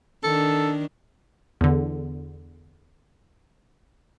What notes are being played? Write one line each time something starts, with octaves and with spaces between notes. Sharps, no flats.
D#3 D4 A4
E2 D3